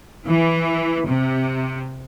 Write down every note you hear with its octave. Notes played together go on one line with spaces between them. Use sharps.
E3
C3